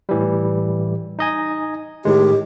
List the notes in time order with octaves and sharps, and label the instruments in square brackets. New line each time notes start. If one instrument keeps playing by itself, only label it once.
[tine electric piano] A2 E3 G3
D#4 D#5 G#5
[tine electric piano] A2 D#3 G#3 [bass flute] G4